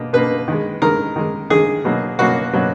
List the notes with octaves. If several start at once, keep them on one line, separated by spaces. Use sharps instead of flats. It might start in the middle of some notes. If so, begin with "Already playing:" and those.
Already playing: B2 A#3
B2 A#3 B4
D#3 G#3
D#3 G#3 A#4
D#3 G#3
D#3 G#3 G#4
B2 F#3 A#3
B2 F#3 A#3 F#4
B2 F#3 A#3